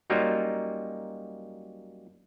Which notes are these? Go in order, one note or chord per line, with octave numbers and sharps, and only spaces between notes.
F#2 F#3 G3 A#3 D#4 F4